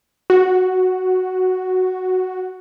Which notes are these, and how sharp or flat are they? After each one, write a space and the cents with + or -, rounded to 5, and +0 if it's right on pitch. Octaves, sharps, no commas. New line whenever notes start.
F#4 +0